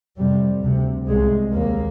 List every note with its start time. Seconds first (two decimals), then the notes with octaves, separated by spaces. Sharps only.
0.18 F2 C3 G3
0.63 D2 C3
1.08 C2 C3 G#3
1.54 D#2 A#3